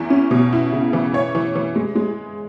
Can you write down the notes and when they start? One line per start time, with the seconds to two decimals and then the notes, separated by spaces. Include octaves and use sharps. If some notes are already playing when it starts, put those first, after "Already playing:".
Already playing: E2 E4
0.10 C#4
0.31 B2
0.53 E4
0.72 C#3
0.93 E3
1.14 C#5
1.35 E3
1.55 E3
1.76 G#3
1.95 G#3